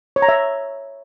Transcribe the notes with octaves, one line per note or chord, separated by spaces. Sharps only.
C#5
A#5
E5